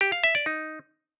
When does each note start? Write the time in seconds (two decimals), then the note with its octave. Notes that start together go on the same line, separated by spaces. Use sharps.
0.01 G4
0.12 F5
0.24 E5
0.35 D5
0.46 D#4